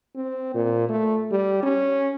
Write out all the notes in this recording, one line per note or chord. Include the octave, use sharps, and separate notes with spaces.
C4
A#2
A3
G3
C#4